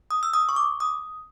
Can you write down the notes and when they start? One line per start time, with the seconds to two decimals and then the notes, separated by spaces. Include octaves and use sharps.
0.11 D#6
0.23 E6
0.33 D#6
0.49 C#6
0.56 D6
0.80 D#6